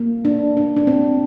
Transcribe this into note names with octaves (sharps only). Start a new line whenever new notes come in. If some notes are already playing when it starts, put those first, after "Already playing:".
Already playing: A#3
D4
D4
D4
C4